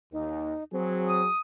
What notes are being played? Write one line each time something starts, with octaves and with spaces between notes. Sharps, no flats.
D#2 D#4
F#3 C4 G#4
D#6